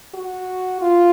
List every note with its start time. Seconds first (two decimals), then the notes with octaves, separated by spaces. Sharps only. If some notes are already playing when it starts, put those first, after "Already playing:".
0.14 F#4
0.81 F4